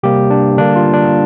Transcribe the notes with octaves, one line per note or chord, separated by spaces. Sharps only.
C3 G3 A#3 G4
D4
D3 G3 A#3 D4
F4
D4